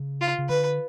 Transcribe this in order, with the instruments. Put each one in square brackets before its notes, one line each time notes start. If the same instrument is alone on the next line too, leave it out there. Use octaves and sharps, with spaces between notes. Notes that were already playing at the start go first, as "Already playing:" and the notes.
Already playing: [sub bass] C#3
[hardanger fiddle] F4
[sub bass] C#3
[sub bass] D3 [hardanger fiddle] B4